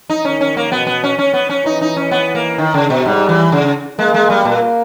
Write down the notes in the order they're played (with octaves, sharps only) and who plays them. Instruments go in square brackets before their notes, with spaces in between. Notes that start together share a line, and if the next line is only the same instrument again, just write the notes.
[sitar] D#4
[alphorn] D#3 [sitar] C#4
[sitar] C#4
A#3
[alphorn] B2 [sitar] B3
[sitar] B3
C#4
C#4
B3
C#4
[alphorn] E3 [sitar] D#4
[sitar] D#4
C#4
B3
A#3
D#3
C#3
B2
[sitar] G#2 [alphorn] G3
[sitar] E3
C#3
[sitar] G#3 [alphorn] A#3
[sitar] G#3
G3
[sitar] A#2 [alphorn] A#3